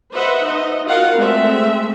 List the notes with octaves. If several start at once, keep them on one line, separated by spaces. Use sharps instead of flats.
B4 C5 D#5 E5 F#5
D#4 D#5
F4 F#4 A#4 F5 F#5
G#3 A3 C4 E5